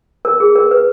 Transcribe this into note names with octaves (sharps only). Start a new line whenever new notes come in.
A#4
G#4
A#4
B4